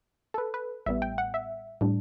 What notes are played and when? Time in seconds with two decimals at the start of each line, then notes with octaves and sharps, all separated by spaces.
0.34 A4
0.38 B4
0.54 B4
0.86 A1 A2 G3 B3 E5
1.02 G5
1.18 F#5
1.34 E5
1.81 A2 G3 D4